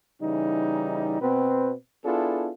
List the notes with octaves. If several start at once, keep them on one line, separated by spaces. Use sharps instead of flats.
C#3 E3 G3 D#4
B2 C4 B4
B3 D4 E4 F4 G#4 A4